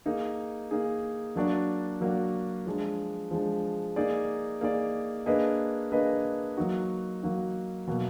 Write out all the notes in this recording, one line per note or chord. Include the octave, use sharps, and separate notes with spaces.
A#3 D#4 G#4
A#3 D#4 G#4
F#3 A#3 D4 F#4 D5
F#3 A#3 D4 F#4 D5
F3 G#3 D4
F3 G#3 D4
A#3 D#4 G#4 D5
A#3 D#4 G#4 D5
A#3 D4 G#4 B4 D#5
A#3 D4 G#4 B4 D#5
F#3 A#3 D#4 F#4
F#3 A#3 D#4 F#4
B2 F#3 A#3